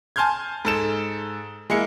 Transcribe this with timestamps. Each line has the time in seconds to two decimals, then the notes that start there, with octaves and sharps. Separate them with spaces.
0.16 G#5 A5 C6 F6 G6 G#6
0.65 G#2 A4 E7
1.70 G#3 A#3 E4 C#7